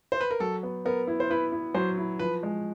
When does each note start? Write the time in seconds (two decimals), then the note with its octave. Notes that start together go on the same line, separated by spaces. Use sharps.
0.12 C5
0.21 B4
0.31 A#4
0.40 F#3 A4
0.63 B3
0.85 B3 A#4
1.07 E4
1.20 C5
1.30 E4 B4
1.52 E4
1.74 F#3 C5
1.98 E4
2.19 F3 B4
2.43 G#3